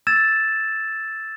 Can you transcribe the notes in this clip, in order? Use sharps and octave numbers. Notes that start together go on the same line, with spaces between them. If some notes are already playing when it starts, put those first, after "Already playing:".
E6 G#6 A6 E7